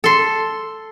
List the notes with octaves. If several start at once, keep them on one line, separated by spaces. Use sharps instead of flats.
A4 C6